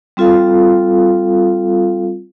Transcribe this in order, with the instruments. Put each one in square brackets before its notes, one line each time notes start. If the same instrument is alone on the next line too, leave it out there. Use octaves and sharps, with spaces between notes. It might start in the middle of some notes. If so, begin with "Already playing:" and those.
[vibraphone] G3 C4 F4 A4 F5